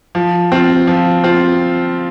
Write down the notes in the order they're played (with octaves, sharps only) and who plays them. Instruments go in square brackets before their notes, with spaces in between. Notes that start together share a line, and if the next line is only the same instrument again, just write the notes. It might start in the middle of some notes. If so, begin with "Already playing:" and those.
[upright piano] F3
C4 F4
F3
C4 F4